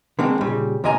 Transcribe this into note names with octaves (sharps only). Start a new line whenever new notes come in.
D3 D#3 G#3 C4
A#2 C#3 G3
D2 A#2 C#3 D#5 G#5 A#5